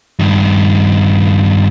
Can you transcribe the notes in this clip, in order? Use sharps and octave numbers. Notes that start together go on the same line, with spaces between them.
G2 D#3